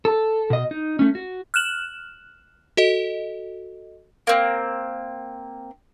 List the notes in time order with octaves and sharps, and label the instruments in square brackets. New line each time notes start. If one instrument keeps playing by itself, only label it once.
[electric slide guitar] A4
B2 D#5
D#4
A3 C#4
F#4
[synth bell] F6 F#6 E7 F#7
F#4 A4 D#5
[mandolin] A#3 C4